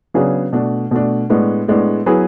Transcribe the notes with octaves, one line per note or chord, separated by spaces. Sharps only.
C#3 F#3 B3 D4 G#4
B2 A3 D4
B2 A3 D4
A2 G#3 B3 D4
A2 G#3 B3 D4
F#3 B3 E4 G#4 B4